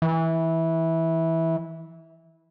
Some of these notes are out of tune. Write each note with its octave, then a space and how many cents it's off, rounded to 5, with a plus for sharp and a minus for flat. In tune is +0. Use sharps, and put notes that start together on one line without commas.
E3 -15